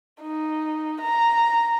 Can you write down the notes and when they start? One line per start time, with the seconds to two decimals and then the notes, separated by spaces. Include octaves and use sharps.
0.21 D#4
1.01 A#5